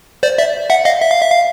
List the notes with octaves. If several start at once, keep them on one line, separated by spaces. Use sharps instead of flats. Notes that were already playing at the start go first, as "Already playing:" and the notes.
C5 D5
D5 E5
E5 F#5
D#5 F5
E5
F5
E5
F5